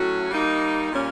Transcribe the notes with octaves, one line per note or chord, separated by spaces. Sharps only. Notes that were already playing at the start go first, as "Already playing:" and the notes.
Already playing: A2 F#3 A3 C#4 F#4
G3 A#3 D#4
A#2 G3 A#3 C#4